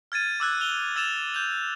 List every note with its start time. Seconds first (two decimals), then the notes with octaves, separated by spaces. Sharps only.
0.12 F6 G#6 A6 D#7
0.40 D6 E6 F#6 G#6
0.61 E6 F7 G7
0.96 E6 A6 E7 F7
1.34 G6 F7